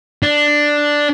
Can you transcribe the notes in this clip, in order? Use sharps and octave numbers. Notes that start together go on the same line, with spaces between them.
D4